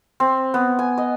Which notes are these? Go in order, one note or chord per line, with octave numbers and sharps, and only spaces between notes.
C4
B3
G#5
D#5